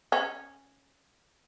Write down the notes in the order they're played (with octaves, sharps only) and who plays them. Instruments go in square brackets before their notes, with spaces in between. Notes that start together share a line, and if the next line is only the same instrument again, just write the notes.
[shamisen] C#4